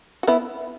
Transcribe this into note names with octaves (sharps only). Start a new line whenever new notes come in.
F#4
B3 E4